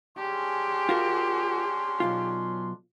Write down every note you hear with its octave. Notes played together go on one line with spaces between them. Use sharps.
C#4 D4 G4 G#4 C6
F4 F#4 A#4
B1 F#2 F4